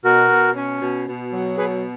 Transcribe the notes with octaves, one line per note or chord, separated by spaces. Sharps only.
B2 F#4 A#4
B2
C#4
B2
B2
F#3
B2 G#4 B4